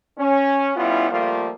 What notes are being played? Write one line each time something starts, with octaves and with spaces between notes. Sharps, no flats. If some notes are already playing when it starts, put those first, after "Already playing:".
C#4
G3 B3 C#4 E4 F4
F3 G3 A3 A#3 F4